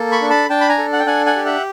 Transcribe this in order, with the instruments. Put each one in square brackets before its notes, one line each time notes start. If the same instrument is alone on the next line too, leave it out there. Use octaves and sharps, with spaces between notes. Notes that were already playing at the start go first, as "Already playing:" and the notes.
Already playing: [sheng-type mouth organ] A#3 A4
B5 C#6
D4
A5 B5
D4 G5 A5
B5
G#5 A#5
A4
F#5
G5
D4 F#5 G#5
F#5 G#5
G4
E5 F#5